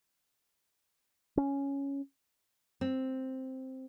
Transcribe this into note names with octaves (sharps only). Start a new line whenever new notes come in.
C#4
C4